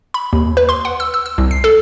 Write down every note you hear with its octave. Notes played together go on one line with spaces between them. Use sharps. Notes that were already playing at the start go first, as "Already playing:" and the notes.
B5
D#2
B4
C6
F#5
E6
E6
E6
C2
C7
A4